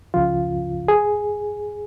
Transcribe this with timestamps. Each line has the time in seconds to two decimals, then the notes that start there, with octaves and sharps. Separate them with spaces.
0.14 C#2 C#3 F3 F4
0.88 G#4